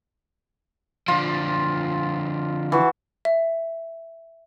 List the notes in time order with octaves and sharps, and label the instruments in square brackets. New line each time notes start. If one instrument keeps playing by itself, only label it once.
[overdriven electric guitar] D3 F3 [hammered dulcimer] F4
[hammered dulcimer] E3 F#4
[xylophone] E5